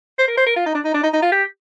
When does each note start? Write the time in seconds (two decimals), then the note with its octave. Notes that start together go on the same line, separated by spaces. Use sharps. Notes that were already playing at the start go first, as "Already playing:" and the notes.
0.19 C5
0.28 A#4
0.37 C5
0.46 A#4
0.56 F4
0.66 D#4
0.75 D4
0.85 D#4
0.94 D4
1.03 D#4
1.14 D#4
1.22 F4
1.32 G4